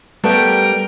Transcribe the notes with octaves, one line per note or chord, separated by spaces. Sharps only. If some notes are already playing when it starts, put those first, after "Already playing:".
G3 A3 B3 A#4 G5